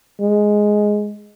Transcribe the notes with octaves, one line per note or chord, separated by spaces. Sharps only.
G#3